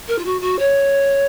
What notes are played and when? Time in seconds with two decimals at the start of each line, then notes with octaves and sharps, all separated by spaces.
0.08 A#4
0.18 F4
0.25 F#4
0.41 F#4
0.59 C#5